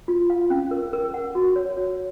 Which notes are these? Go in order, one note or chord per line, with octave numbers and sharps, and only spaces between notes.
F4
F5
C#4
A#4
A#4
F#5
F#4
C#5
C#5